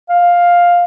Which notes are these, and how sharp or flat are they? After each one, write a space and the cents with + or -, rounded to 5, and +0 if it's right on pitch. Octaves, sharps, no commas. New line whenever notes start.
F5 +5